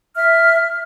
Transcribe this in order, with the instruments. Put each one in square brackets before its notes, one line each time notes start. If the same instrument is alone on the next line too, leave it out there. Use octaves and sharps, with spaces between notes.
[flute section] E5 F6